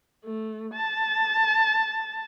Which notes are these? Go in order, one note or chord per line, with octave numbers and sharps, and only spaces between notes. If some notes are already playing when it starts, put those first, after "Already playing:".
A3
A5